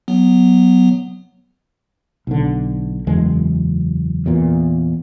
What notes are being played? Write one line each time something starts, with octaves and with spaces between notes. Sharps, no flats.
F#3 B3
B1 D3
F#1 E2 G#3
E2 A#2